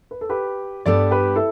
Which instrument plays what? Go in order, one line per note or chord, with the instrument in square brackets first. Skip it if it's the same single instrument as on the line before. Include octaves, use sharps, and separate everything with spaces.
[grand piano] B4
A4
G4 B4
[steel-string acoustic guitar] G2 G3 B3 D4 [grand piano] A4 D5
[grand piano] G4 B4
E4 A4